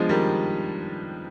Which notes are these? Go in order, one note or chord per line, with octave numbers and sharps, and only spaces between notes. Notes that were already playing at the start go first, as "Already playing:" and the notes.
Already playing: F3 G#3 B3 D4
D#3 G3